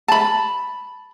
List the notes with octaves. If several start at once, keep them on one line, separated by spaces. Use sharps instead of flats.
A5 B5